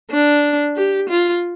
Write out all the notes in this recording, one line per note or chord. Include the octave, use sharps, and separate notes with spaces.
D4
G4
F4